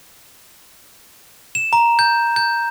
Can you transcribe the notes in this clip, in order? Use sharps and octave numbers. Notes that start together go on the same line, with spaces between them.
E7
A#5
G6
G6